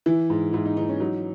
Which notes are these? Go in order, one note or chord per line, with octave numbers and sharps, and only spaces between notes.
E3 E4
G#2
G#2 E4
D#4
E3 D#4
C#4
F#3 D#4